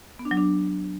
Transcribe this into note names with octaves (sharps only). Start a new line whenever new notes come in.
B3
D4
F#3
D4